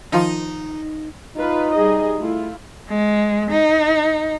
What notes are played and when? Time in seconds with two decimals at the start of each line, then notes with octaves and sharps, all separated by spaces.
0.12 D#3 F3 D#4 F4
1.37 D#4 F4 B4
1.74 G3 G#4 D#5
2.19 A3 E4 F4
2.89 G#3
3.51 D#4